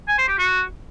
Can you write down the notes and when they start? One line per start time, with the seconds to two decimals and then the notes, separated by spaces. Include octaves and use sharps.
0.08 G#5
0.18 C5
0.28 G4
0.38 F#4